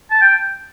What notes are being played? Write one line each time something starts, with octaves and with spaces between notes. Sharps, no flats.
A5
G5